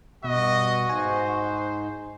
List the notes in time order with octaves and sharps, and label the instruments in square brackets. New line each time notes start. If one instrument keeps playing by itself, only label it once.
[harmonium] G2 [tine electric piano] B2 [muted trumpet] F#4 [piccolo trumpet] D#5
[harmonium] G#2 D#4 [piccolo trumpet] C5 [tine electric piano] G#5